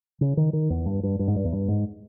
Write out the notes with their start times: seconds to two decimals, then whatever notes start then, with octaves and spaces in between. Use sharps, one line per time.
0.21 C#3
0.37 D#3
0.53 D#3
0.70 E2
0.86 G2
1.03 G2
1.19 G2
1.28 G#2
1.36 G2
1.44 E2
1.53 G2
1.68 G#2